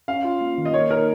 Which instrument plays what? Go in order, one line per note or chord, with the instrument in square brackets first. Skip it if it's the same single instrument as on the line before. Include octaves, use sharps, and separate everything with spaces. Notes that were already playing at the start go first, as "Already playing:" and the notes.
[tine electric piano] C#4 [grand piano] F5
[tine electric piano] F4
A#3
D#3
[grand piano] D#5
[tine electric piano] A#3 [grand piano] C#5
[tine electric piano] D#4 [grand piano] A#4